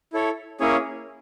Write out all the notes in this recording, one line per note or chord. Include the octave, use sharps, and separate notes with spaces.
E4 A4 C#5
A#3 C#4 E4 G#4 C#5